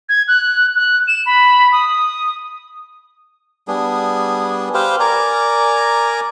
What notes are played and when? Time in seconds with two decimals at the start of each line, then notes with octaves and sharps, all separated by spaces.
0.09 G#6
0.28 F#6
0.76 F#6
1.08 E7
1.26 B5
1.72 D#6
3.68 G3 B3 D4 G#4
4.74 G4 B4 C5 F5
5.00 A#4 D5 G#5 A#5